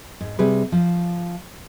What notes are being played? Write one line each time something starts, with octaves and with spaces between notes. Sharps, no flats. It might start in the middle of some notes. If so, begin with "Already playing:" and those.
G#2
C3 G3 G#4 B4
F3